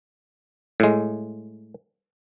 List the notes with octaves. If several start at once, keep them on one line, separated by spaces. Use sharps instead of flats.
A2 G#3